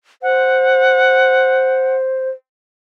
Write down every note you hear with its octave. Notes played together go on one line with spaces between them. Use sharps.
C5 F#5